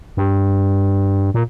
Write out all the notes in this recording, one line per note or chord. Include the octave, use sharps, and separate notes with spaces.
G2
A#2